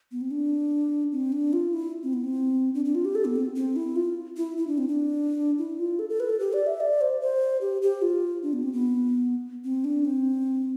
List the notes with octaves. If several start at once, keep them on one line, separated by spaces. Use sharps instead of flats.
B3
C4
D4
C4
D4
F4
E4
C4
B3
C4
D4
D4
F4
G4
A4
B3
C4
C4
E4
F4
E4
E4
D4
C4
D4
E4
F4
A4
A4
B4
A4
G4
D5
E5
D5
C5
C5
G4
G4
F4
D4
B3
C4
B3
C4
D4
C4